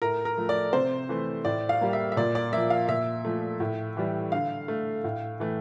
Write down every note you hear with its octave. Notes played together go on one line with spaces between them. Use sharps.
A2 A#4
A#4
F3 A3
D5
C3 C5
E3 A3
A2 D5
F5
G3 A#3
E5
E5
A#2 D5
D5
F3 A#3 E5
F5
A#2 E5
F3 A3
A2
E3 G3
D3 F5
A3
A2
E3 A3